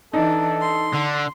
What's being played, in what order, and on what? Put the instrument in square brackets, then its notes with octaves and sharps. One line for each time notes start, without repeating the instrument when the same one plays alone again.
[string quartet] E3 D4 [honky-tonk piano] D#4 [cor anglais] A4
[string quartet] C6
[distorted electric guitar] D3